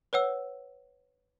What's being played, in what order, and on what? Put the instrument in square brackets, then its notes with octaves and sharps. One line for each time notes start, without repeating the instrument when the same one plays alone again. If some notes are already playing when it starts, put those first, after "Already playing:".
[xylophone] B4 C#5 F#5 E6